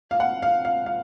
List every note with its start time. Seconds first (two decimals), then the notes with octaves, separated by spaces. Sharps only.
0.11 F5
0.20 F#5
0.42 F5
0.65 F5
0.86 F5